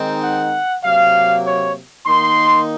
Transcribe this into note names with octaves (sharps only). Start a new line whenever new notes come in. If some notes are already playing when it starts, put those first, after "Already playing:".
Already playing: D#3 G#3 C4 D#4
F#5
C3 F#3 A#3 F5
C#5
D#3 A#3 D#4 C6